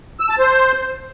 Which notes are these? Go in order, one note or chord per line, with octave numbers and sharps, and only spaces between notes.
E6
A5
C5